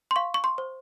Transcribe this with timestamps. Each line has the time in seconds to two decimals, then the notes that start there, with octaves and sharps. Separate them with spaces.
0.11 C6
0.16 F5 C#6
0.34 C#6
0.44 C6
0.58 C5